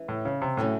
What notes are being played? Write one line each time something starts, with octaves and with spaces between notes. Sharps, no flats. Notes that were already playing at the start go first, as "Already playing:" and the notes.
Already playing: E3 G#3 C#4
A2
C#3
C3
A2 C#3 F#3 A3 C#4